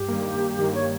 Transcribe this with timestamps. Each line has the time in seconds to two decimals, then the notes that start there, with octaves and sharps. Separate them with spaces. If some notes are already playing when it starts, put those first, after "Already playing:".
Already playing: G2 G4
0.08 D#3 G3 A#3
0.33 G2
0.59 D#3 G3 A#3
0.75 C#5